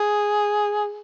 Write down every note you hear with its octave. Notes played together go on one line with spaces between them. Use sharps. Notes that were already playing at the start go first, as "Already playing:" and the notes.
Already playing: G#4